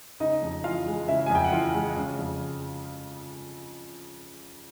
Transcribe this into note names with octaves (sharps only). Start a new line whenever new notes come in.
C#3 D#4 D#5
F2
E3 F4 F5
G#3
C#3 E4 E5
F2 G#5
G5
F#5
E3 F4 F5
G#3
C#3
F2